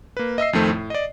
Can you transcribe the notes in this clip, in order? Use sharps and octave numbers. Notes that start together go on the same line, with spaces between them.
A#3 B4
D#5 E5 E6 C7
F2 D#3 A3 C4
A2
D5 D#5